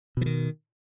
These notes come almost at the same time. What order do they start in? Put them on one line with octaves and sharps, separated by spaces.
B2 E3 D#3